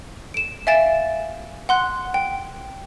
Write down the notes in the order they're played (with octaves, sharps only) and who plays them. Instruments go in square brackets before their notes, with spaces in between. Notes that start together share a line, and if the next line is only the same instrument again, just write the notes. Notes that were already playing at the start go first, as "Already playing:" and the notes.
[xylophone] D7 E7
E5 F5 G#5 A6 D7 E7
F#5 C6 F#6
G5